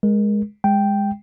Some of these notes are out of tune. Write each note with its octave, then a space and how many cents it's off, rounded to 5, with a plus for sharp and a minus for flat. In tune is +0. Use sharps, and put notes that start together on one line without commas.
G#3 +0 A#4 +20
G#3 -15 G5 +0